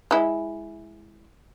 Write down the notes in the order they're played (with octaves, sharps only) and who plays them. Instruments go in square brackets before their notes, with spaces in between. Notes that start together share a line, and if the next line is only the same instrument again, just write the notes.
[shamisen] G#3 E4